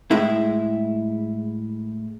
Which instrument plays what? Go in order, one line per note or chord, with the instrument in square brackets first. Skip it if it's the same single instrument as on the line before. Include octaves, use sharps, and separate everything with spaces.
[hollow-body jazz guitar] A2 G#3 E4